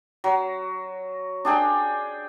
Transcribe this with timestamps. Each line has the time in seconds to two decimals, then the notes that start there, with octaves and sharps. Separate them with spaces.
0.24 F#3
1.45 D4 G#4 G5